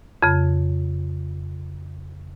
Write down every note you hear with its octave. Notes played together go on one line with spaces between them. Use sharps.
F2 C#3